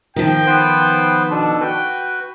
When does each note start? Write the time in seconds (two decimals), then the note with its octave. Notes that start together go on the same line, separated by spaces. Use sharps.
0.16 D#3 F3 G5
0.47 B3 B4 C5
1.30 B2 D4 A4
1.61 F#4 B4 G5